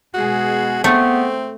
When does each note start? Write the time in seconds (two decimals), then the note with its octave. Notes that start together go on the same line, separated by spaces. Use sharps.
0.14 B2 G#3 F#4 G#4
0.84 A3 B3 C4